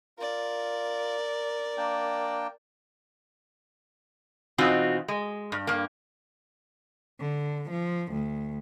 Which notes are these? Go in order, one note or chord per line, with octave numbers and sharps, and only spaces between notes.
F4 A#4 D5
A#3 D4 G5
B2 E3 C4 D#4 F4 F#4
G#3
G2
G2 A#3
D3
F3
D2